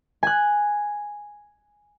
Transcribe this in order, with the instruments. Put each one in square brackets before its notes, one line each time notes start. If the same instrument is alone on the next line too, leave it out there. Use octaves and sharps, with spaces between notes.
[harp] G#5 F#6